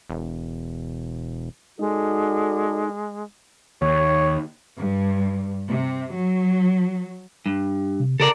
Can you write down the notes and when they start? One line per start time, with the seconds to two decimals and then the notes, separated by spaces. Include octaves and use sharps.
0.10 E1
1.79 G#3 D#4 F#4 A4 D5
3.82 D#2 C#5
4.79 G2
5.69 C3
6.15 F#3
7.46 G2
8.00 C3
8.20 C#3 A4 A#4 D5